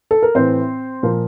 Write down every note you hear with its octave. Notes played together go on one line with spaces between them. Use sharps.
A4
A#4
A2 E3 C4 C5
A#2 F3 A#4